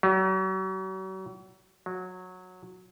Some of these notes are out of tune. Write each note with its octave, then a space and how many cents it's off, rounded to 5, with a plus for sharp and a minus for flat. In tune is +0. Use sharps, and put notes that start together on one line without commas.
F#3 +40
F#3 -15